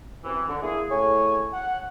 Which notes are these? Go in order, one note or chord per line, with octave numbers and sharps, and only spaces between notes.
F#2 C3 E3
D3
A#3 E4 G#4
A2 C#3 C#5 G#5
F#5